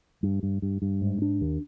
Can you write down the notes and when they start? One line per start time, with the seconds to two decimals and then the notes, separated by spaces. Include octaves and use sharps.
0.23 G2
0.43 G2
0.62 G2
0.82 G2
1.01 G#2
1.22 D4
1.41 D#2